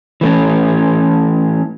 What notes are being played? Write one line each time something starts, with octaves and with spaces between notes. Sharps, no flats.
E3 A3 C#4